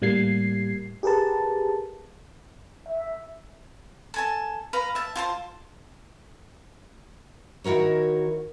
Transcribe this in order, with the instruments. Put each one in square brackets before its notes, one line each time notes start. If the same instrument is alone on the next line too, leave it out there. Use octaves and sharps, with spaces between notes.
[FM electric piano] A2 G3 A#3 G#6 C7
G4 G#4 A#4 B4 A5
[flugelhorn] E5
[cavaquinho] A4 G#5 A5
B4 F5 A#5
E5 A5
F4 C5 A5
[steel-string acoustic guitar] D#3 E4 F#4 A#4 C#5